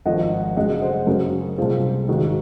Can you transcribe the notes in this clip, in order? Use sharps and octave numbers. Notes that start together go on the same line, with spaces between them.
G#1 G#2 F3 D#5 F#5
F#2 C#3 G#3 D#5 F#5
C5 D#5
F#2 C#3 F#3 C4 F#4 A#4
C2 A#2 G#3 C4 F4 G#4
G#1 G#2 D#3 G#3 F#4